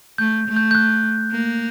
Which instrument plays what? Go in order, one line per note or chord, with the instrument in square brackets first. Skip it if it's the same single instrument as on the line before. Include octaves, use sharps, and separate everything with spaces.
[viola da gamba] A3 [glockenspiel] G6
[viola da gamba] A3
[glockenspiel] G6
G6
F#6
[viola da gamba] A#3